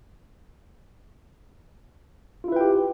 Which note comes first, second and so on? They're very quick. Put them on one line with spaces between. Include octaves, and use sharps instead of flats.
F4 E4 B4 G5 G4